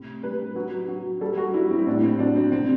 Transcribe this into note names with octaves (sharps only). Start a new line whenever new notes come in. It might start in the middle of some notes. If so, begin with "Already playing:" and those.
Already playing: A2 C3
G3 B4
F#3
F#3
G3 A4
F#4
G3 E4
C4
E4
A2 D4
C4
F#3 D4
C4
C3 C4